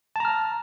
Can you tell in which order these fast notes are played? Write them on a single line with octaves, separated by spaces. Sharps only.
A5 A#5 F6